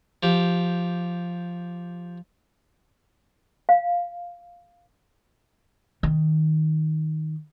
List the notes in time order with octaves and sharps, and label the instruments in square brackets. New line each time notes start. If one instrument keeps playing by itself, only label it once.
[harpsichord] F3 G4
[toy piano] F5
[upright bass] D#3